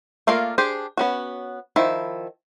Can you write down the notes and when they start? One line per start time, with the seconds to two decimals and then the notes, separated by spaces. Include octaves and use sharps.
0.27 A3 A#3 F4 A#4 D5
0.58 D4 G4 G#4 C5
0.97 B3 C#4 F#4
1.76 D#3 F3 E4